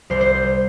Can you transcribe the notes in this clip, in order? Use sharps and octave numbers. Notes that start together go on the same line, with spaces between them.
C2 C5
C5